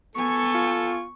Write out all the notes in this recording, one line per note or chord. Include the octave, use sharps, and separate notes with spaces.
B3 A4 G#5 C#6
F4